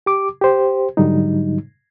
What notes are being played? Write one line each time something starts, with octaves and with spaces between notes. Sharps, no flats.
G4 D6
G4 C5
G#2 D3 F#3 G3 D#4